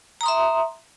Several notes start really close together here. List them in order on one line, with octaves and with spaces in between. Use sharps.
A#5 D#6 C6 E5